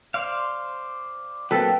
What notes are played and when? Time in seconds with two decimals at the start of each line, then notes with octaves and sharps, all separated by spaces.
0.14 C5 D5 F5
1.51 F#3 A#3 C4 A4 B4 G5